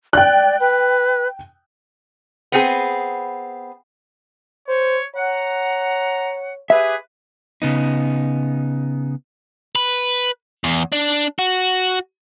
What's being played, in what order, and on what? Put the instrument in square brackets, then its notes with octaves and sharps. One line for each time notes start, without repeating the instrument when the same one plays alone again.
[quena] D5 [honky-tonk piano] G5 F#6
[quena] B4
[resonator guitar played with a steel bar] B3 C4 G#4
[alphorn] C5 [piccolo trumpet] C#5
[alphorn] C#5 [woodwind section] F#5 [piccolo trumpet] A#5
[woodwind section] G4 B4 [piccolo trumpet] G#4 [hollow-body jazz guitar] E5
[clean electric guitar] C#3 B3 D#4
[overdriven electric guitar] B4
E2
D4
F#4